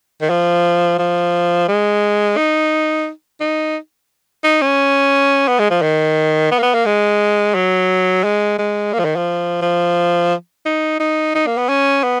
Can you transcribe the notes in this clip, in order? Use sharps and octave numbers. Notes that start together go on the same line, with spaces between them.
D#3
F3
F3
G#3
D#4
D#4
D#4
C#4
B3
G#3
F3
D#3
B3
A#3
B3
A#3
G#3
F#3
G#3
G#3
A#3
F3
D#3
F3
F3
D#4
D#4
D#4
A#3
B3
C#4
B3